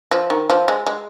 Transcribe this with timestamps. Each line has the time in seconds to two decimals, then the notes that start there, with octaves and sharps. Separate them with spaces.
0.11 F3
0.30 D#3
0.50 F3
0.68 G#3
0.87 G#3